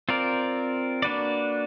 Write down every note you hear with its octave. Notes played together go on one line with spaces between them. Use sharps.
C4 F4 A#4 D5
A#3 D4 F#4 B4 D5